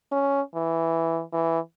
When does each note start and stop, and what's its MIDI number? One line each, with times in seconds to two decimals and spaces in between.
0.12 0.41 61
0.55 1.22 52
1.33 1.59 52